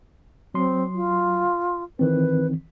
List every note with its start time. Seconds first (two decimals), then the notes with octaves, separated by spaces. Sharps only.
0.54 F#3 C4 C6
0.95 F4
1.99 D#3 E3 C4 B4